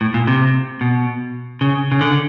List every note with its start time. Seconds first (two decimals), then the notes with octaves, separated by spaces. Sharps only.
0.01 A2
0.14 A#2
0.27 C3
0.81 B2
1.61 C#3
1.92 C#3
2.01 D3